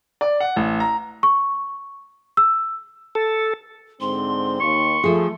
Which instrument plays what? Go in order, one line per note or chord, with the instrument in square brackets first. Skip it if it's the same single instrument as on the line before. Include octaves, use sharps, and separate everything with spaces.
[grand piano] D5
F#5
A1
A#5
[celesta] C#6
E6
[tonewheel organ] A4
[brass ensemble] G#2 D3 C4 [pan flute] C6
[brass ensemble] D#2 [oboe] C#6
[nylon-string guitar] F3 G#4 [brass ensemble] A3